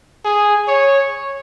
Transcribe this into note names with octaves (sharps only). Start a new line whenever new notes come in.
G#4
C#5